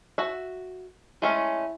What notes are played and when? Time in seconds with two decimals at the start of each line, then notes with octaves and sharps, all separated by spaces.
0.18 F#4 E5
1.22 G#3 A3 C#4 E4